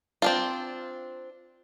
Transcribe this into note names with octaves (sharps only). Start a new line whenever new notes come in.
C4 D4 F4